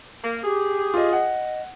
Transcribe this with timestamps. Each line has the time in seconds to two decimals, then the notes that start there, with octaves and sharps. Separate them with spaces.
0.24 A#3
0.44 G4 G#4
0.94 F4 D#5
1.13 D#5 F#5